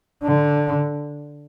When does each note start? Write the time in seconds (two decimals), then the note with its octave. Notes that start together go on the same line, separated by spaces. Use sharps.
0.24 D3